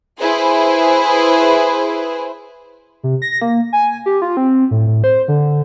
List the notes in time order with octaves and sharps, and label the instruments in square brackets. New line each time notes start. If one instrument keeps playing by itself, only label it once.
[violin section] E4 G#4 B4 C5
[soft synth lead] C3
A#6
A#3
G#5
G4
F4
C4
A2
A2
C5
D3